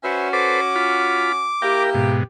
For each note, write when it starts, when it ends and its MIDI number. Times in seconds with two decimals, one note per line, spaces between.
0.04 1.52 61
0.04 1.52 66
0.04 0.29 71
0.04 0.29 72
0.04 0.29 76
0.33 0.61 69
0.33 0.61 71
0.33 0.61 72
0.33 1.83 86
0.76 1.32 65
0.76 1.32 83
1.62 2.19 58
1.62 2.19 64
1.62 2.19 67
1.62 1.90 70
1.62 1.90 79
1.94 2.24 44
1.94 2.24 47